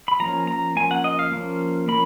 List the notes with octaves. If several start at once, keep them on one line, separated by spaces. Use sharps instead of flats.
B5
F3 A#3 C#4 A#5
A#5
F3 A#3 C#4 G#5
F#5
D#5
F5
F3 A#3 C#4
F3 A#3 C#4 B5